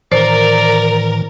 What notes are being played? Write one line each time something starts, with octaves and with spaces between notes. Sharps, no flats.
A2 D#3 E3 A#4 C5 D5